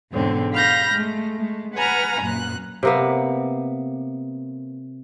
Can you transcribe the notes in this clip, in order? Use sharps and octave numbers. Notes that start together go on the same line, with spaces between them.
E2 G#2 B2 D3 C4 C#4
F5 B5 F6 G6 A#6
G#3 A3
G#3 A3
B4 F#5 G#5 A#5 B5 F6
F#2 A#2 F#6
C3 A#3 B3